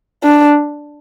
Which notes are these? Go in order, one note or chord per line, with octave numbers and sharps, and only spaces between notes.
D4